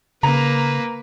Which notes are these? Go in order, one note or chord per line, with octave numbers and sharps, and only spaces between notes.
C#3 A#3 B4 A#5